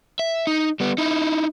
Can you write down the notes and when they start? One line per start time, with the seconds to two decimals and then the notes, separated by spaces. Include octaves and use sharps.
0.19 E5
0.47 D#4
0.80 G3 B3
0.98 D#4 E4